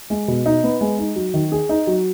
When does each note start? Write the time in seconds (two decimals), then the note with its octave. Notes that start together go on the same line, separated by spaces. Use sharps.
0.10 G#3
0.28 B2
0.46 D#4
0.64 B3
0.81 G#3
0.99 D#4
1.16 F#3
1.34 D#3
1.52 G#4
1.69 D#4
1.87 F#3